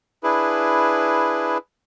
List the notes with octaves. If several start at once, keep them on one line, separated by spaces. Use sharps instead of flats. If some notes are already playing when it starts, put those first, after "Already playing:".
D4 E4 G#4 B4